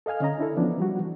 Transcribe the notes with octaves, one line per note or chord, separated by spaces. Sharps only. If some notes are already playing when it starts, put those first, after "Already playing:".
A4 D#5 F5 G#5 F6
D3 C#4 D#5 A#5
D4 E4 A4
E3 F3 B3 C#4 D4
F3 G3 F#4
E3